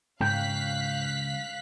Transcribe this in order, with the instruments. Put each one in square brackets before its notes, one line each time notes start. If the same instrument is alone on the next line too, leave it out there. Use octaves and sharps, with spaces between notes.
[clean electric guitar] C#2 C#4 G5 [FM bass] G#2 [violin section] F5 F#6 B6